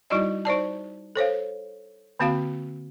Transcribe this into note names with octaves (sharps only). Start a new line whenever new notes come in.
G3 D#4 E4 F#4 D5 D#5
D#4 C5 D5 A5
A4 C5 C#5 F5
D3 A#3 C4 F#4 F5